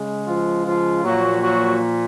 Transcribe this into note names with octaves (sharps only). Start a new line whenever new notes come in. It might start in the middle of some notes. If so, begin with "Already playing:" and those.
Already playing: C#3 G#3
F3 F4
F3 F4
A#2 F3 F#3 A#3 F#4
F#3 F#4